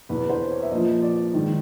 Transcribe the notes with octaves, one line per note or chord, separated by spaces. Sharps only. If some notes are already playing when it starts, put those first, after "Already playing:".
E2 B2 B4
C5
C#5
E5
A#2 F3 D#5
D5
G#2 D#3